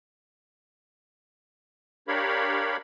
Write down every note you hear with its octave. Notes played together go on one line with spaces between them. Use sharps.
D4 G4 A#4 C#5 F5 B5